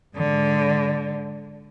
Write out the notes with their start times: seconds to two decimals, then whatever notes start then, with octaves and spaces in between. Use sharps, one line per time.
0.16 G#2 D3